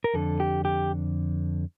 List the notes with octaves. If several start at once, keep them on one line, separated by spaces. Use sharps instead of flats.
A#4
F2 D3 A4
G4
G4